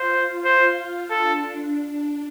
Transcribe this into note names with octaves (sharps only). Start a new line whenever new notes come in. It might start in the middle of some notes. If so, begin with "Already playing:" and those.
Already playing: F4 C5
F4 C5
D4 A4